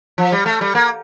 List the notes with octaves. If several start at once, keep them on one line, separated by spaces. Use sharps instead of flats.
F3
G3
A3
G3
A#3